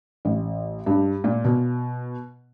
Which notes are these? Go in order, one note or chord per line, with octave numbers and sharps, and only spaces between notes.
A1
G2
A#2
B2